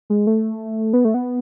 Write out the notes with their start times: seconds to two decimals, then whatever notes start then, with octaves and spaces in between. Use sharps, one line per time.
0.10 G#3
0.27 A3
0.93 B3
1.05 A3
1.14 B3